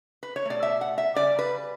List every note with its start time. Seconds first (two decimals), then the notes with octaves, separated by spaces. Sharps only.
0.23 B4
0.36 C#5
0.45 B2 A3 D5
0.63 E5
0.81 F#5
0.98 E5
1.15 C#3 G3 D5
1.39 B4